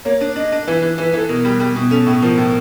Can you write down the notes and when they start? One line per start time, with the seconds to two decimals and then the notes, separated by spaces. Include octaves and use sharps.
0.05 A#3 C#5
0.21 D4
0.36 D4 D#5
0.52 D4
0.67 E3 B4
0.82 E3
0.98 E3 B4
1.13 E3 A4
1.29 B2 A#4
1.45 G3
1.60 G3
1.76 B2
1.91 C#4 A4
2.06 A2
2.22 F3 A#4
2.37 A2